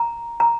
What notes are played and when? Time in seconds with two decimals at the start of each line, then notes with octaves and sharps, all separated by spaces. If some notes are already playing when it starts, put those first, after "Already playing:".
Already playing: A#5
0.40 A#5